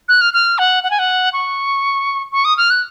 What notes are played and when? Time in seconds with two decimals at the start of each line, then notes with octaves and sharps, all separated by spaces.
0.08 F#6
0.21 F6
0.33 F6
0.58 F#5
0.84 F#5
0.91 G#5
0.99 F#5
1.33 C#6
2.32 C#6
2.45 D#6
2.57 F6
2.70 F#6